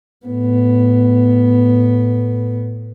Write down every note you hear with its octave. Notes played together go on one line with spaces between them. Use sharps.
A2 B3